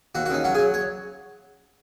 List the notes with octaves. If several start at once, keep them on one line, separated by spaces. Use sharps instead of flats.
D#2 F#4
F#4
C#3 D#4
F#3 F#4
G#4
F#3
C#5